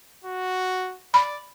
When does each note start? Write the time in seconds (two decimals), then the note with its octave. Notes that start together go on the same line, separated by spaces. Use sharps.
0.25 F#4
1.14 D5 B5